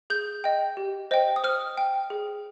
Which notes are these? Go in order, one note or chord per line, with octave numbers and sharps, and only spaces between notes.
G#4 G6
D#5 G5
G4
C5 D#5 G5
D#6
C5 F6
G5
G#4